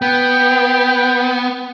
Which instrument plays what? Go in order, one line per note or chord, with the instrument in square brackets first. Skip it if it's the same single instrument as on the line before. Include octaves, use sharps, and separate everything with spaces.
[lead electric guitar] B3 [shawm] G5